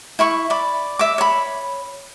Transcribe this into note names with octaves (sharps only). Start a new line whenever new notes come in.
E4 B5 C#6
D5 B5
E5 D6
C#5 B5